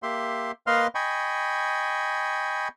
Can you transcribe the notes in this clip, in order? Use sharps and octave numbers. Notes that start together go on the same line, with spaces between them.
A#3 G4 E5 C6
A#3 B4 D#5 F5 C6 F6
D#5 G5 G#5 B5 C#6